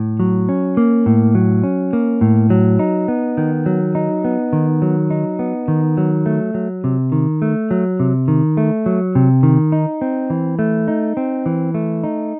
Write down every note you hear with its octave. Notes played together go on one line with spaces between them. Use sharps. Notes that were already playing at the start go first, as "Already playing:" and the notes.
Already playing: A2
F#3
C#4
A#3
A2
F#3
C#4
A#3
A2
F#3
D#4
B3
D#3
F#3
D#4
B3
D#3
F#3
D#4
B3
D#3
F#3
A3
F#3
C3
D#3
A3
F#3
C3
D#3
A3
F#3
C3
D#3
D#4
C4
E3
A3
D#4
C4
E3
A3
D#4